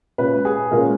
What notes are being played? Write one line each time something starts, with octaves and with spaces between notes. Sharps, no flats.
A#2 G#3 C#4 B4
G#4
A#2 G#3 C#4 A#4